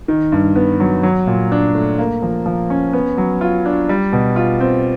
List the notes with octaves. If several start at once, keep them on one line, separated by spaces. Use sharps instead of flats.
D#3
G2
B3
F#3
F#3
A#2
D4
A3
A#3
F3
F3
C#4
B3
F#3
F4
D4
G3
B2
F4
C4